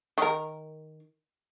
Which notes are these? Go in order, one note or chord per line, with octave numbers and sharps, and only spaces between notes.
D#3 A#4